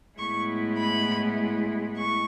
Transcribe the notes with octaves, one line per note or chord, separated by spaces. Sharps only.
A2 G#3 B3 E4 C#6
B5
C#6